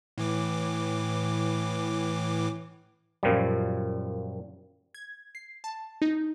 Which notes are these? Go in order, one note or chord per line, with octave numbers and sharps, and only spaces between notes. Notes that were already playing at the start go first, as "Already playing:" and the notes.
A2 E3 D6
F#2 A#2 F3 G3
G#6
C7
A5
D#4